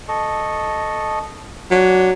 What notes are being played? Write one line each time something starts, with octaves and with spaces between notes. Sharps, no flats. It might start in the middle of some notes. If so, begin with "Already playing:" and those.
A4 D#5 C#6
F#3 D4